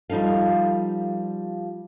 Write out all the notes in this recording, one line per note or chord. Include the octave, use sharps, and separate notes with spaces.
F3 G3 D#4 A4 F5